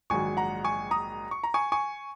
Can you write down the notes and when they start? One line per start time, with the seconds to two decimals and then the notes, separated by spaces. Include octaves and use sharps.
0.10 A#1 G#2 D#3 F#3 G#5 C#6
0.37 F#5 A#5
0.64 G#5 C#6
0.91 A#5 D#6
1.31 C#6
1.44 A#5
1.54 G#5 C#6
1.72 G#5 C#6